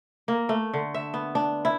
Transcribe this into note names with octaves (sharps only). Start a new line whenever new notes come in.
A#3
A3
D3
E5
B3
D4
E4